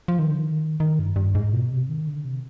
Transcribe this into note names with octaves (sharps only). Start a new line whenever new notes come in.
F3
D#3
D3
D#3
D#3
G2
G2
G#2
B2
C3
D#3
D3
C3